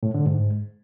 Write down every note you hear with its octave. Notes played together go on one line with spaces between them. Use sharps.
A2
D3
G#2